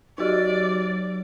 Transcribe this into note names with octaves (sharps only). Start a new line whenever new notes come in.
F#3 D#4 F#4 G4 D5